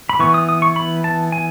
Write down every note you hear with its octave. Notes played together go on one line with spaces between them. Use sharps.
B5
E3 B3 C#6
D#6
D#6
C#6
B5
A5
G#5